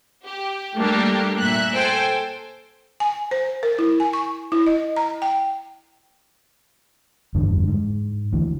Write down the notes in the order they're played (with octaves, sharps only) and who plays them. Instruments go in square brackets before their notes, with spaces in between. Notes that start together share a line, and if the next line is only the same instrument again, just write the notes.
[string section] G4
G3 A3 A#3 D4 G4 A4
A#2 E5 F#6
A4 C5 G5 G#5
[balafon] G#5
C5
A#4
E4
G#5
C#6
E4
D#5
A#5
G5
[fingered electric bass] F1 E2 G2 D3
G#2
D2 E3